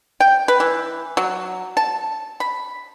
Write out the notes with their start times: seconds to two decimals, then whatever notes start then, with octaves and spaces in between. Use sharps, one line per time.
0.20 G5
0.48 B4
0.60 E3
1.17 F#3
1.77 A5
2.40 B5